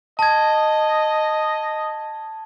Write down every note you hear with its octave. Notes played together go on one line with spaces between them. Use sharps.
D#5 A5 G#6